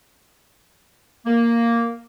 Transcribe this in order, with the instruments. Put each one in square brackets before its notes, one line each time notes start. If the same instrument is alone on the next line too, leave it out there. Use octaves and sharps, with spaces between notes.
[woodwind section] A#3